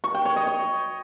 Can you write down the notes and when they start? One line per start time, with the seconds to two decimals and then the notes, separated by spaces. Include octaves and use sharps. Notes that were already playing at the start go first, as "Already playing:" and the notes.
0.04 C#6
0.15 G5
0.25 C#5
0.36 D#5
0.47 C#5